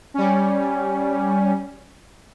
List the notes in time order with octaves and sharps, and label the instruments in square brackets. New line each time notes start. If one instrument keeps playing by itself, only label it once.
[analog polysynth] G3 C#4